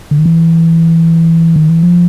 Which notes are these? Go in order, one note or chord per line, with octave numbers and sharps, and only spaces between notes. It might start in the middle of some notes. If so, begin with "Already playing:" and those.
D3
D#3
E3
D#3
E3
F3